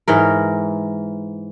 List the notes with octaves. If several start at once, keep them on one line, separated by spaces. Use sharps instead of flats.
G#2 E3 A#4